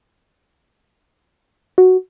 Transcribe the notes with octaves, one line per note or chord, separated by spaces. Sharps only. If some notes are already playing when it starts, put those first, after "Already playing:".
F#4